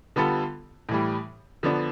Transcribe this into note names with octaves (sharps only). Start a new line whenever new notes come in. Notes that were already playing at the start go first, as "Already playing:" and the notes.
D3 G3 B3 F4 A4
A2 E3 G3
D3 F3 B3 D4